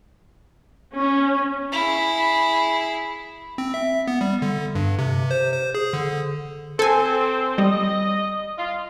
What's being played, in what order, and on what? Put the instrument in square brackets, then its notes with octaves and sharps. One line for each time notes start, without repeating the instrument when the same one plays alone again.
[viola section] C#4
[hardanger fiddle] E4 G#4
[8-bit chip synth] C4
E5
B3
G3
D3
G2
C3
C5
C5
G#4
D3
[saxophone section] C4 [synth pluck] A4 G#5
[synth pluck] G3 [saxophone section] D#5
[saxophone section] F4